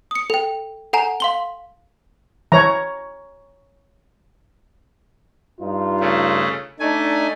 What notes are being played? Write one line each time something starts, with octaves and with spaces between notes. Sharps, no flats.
D#6 C#7
A4 G5
A4 F#5 G#5 A#5
F5 C6 G7
E3 C#5 A#5
G2 D#4 F4
C#3 A3
A3 D4 D#4 G#5